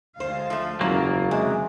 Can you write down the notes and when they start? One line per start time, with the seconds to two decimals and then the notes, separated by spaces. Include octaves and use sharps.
0.20 D2 G#3 C5 F5
0.50 F3 A3
0.81 F#1 E2 C#3 F#3 A#3 F4
1.31 C3 G#3